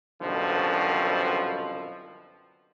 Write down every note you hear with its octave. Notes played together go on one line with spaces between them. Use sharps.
C2 F#2 B2 D3 F3